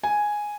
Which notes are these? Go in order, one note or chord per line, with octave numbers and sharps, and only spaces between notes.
G#5